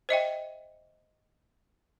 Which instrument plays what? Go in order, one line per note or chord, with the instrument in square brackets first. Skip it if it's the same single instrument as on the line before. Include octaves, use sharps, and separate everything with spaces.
[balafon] C5 D#5 E5 G5